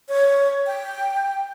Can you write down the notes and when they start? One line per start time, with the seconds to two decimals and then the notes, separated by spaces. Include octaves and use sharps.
0.09 C#5
0.66 G5